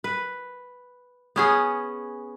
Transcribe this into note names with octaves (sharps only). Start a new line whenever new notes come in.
B4
B3 C#4 G#4